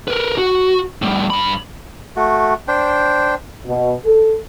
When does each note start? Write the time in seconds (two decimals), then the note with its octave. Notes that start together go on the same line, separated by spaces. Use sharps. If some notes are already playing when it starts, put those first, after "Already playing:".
0.08 A#4 B4
0.38 F#4
1.02 A2 G3
1.30 G2 B5
2.16 A3 F#4
2.68 D4 C5 G5
3.67 B2
4.05 A4